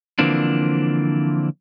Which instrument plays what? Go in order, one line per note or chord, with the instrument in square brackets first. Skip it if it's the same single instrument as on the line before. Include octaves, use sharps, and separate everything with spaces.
[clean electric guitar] D3 E3 F3 A#3 C4 D4